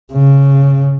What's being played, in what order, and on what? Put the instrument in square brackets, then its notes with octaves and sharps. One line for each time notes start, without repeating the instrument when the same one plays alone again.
[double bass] C#3